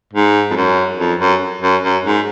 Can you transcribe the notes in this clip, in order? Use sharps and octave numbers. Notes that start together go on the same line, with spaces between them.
G#2
F2
F#2
F2
F#2
F#2
F#2
G#2